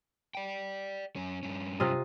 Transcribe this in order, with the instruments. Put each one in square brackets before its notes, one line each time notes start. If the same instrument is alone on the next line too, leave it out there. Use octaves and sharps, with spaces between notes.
[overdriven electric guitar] D5 G5
F#2 C#4
G2 C#4
[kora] C3 F4 D#5